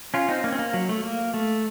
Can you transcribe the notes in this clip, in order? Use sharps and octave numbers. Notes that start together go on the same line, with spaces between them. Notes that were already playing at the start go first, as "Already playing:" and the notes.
C#4 F4
C4 D#4
A#3 C#4
C4
A#3
F#3
A3
A#3
A3